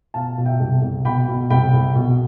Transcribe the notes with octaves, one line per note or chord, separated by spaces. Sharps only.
B2 F5 A5
B2
E5 G5
C2
C2
B2 G5 B5
B2
C2 G5 B5
C2
B2